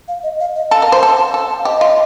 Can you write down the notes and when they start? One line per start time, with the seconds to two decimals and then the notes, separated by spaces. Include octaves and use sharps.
0.08 F5
0.23 D#5
0.40 F5
0.56 D#5
0.71 A4 F5
0.82 A#4
0.92 C5
1.03 A4
1.34 A4
1.59 F5
1.65 G4 D#5
1.81 F4